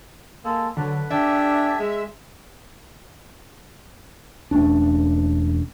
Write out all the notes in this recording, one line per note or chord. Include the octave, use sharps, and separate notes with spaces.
G#3 A#3 A4
D3 F#3 B4
D4 G4 A4 E5 G#5
G#3
E1 A3 C#4 D4